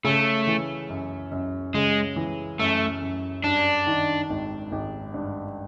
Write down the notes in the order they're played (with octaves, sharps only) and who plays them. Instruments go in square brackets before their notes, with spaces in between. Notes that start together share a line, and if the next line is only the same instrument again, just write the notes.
[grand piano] C#3 [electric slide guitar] A3
[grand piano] E3
F#2
F#2
[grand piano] C#3 [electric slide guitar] G#3
[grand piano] E3
[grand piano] F#2 [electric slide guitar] A3
[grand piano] F#2
[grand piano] G2 [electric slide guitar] D4
[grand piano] D#3
G#1
G#1
G2